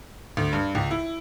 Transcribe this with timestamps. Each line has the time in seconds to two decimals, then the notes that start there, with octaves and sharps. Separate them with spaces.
0.37 D2
0.53 G2
0.75 C#2
0.91 E4